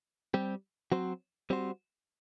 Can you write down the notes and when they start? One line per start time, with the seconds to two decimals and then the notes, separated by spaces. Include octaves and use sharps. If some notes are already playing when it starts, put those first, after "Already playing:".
0.34 G3 C4 G4
0.92 F#3 C4 F#4 C5
1.50 G3 C4 F#4 C5